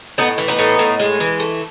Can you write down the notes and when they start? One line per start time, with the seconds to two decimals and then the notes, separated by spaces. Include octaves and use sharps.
0.18 A2 B3 D#4
0.38 E3
0.48 B3 D#4
0.59 A2
0.79 A2
0.99 G#3
1.20 E3
1.40 A3